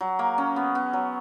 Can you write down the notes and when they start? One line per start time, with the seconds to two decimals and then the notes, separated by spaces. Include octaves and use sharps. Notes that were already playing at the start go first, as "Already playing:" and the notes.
0.01 F#3
0.19 A#3
0.38 C#4
0.56 B3
0.75 B3
0.93 F#3